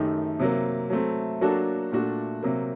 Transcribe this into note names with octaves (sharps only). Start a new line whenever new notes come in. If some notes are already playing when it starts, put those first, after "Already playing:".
Already playing: F#2 D#3 A3 D#4 G4
C3 F#3 A#3
F#3 A3 C4
F#3 A#3 D4 F#4 A4
A#2 A3 D4 F#4
C3 F#3 A#3